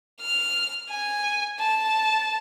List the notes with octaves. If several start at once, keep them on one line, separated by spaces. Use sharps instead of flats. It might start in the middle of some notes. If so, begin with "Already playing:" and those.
F6
G#5
A5